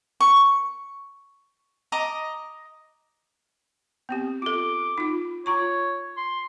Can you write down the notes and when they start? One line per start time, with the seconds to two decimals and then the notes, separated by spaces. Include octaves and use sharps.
0.21 C#6
1.92 D#5 A#5 D6
4.09 B3 C4 G4
4.42 F4 A4 D6
4.98 D#4 F4
5.46 F4 C#5 A#5 C#6
6.17 C6